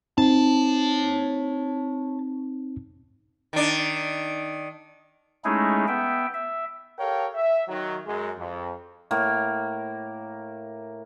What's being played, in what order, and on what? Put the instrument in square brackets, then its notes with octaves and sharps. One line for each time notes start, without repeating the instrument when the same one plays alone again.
[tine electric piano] C4 D#4 [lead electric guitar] C#5 A5
[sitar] D#3 D4
[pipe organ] G#3 A3 C#4 D#4 E4 G#4
B3 E5 G5
E5
[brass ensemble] G4 A4 A#4 C#5 F5 G5
E5
D#3 F#3
F#2 G#3
F2
[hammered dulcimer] A2 A#3